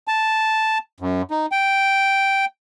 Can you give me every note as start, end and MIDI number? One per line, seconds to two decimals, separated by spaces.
0.08 0.78 81
1.00 1.22 42
1.31 1.46 63
1.52 2.45 79